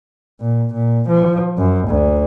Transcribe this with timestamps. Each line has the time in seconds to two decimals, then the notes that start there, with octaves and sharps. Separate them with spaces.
0.41 A#2
0.74 A#2
1.08 F3
1.58 F#2
1.88 D2